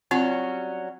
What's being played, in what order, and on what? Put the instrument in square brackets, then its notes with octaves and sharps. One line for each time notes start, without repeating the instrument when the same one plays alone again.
[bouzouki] F#3 G3 C#4 [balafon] C4 F4